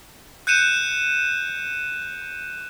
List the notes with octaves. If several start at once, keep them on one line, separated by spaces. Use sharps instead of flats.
F#6 G6 C#7 D#7 E7